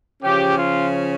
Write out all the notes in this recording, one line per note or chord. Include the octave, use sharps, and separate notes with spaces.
C#3 F3 C#4 G4
F4